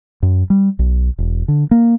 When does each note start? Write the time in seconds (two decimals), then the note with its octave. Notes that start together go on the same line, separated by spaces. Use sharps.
0.23 F#2
0.50 G3
0.79 B1
1.18 E1
1.48 D3
1.71 A#3